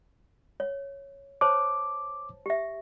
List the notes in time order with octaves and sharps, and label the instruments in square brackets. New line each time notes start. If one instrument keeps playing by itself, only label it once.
[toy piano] C#5
[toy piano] C5 C#5 A5 [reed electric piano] D6
[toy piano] G4 E5